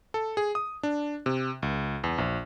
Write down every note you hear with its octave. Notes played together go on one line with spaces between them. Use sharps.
A4
G#4
D#6
D4
C3
C#2
E2
A#1